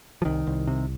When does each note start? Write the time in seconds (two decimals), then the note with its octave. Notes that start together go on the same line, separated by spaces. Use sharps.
0.22 F3
0.25 C2 D#3
0.47 C2
0.67 C3